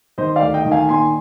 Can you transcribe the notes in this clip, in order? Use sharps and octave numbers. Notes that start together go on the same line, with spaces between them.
D#3 C5 D#5
D5 F5
D2
D#5 G5
D#3
F5 G#5
A#2 G#5 C6